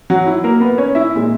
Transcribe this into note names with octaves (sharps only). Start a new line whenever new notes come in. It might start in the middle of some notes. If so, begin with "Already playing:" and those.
F#3 F#4
E4
A#3 A#4
B3 B4
C#4 C#5
E4 E5
A#2 G#3